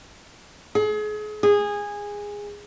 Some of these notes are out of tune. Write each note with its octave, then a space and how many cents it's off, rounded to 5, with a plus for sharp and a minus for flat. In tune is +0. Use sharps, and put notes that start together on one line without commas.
G#4 +35
G#4 -15